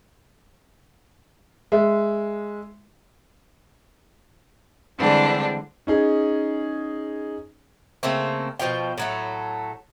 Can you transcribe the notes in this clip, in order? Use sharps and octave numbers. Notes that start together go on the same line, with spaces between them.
G#3 E5
D3 E3 G3 G#3 C4 D4
C#4 D#4 G#4
C#3 A3 A#3 C4
B2 F3 F4 G5
A2 F#3 A3